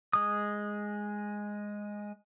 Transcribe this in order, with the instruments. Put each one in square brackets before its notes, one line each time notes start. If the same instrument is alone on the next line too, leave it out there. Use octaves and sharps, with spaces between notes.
[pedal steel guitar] G#3 D#6